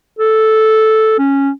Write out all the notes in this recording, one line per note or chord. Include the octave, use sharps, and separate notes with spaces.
A4
C#4